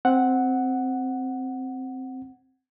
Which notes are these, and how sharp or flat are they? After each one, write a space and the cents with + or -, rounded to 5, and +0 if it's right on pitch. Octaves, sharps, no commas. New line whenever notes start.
C4 +0 F#5 +0